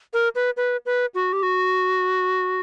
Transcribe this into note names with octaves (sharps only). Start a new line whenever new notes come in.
A#4
B4
B4
B4
F#4
G4
F#4